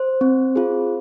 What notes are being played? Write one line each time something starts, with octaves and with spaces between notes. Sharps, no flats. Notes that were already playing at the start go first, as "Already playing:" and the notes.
Already playing: C5
C4
F4 G#4